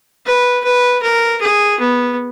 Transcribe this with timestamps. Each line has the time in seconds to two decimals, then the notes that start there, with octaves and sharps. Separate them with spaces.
0.26 B4
0.64 B4
1.03 A#4
1.41 G#4
1.80 B3